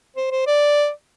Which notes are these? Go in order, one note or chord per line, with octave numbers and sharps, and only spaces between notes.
C5
C5
D5